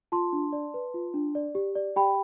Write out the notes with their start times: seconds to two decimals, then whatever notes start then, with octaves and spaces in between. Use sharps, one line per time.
0.12 F4 A5 C6
0.33 D4
0.53 D5
0.74 B4
0.94 F4
1.14 D4
1.35 D5
1.55 G4
1.75 D5
1.96 G4 G5 B5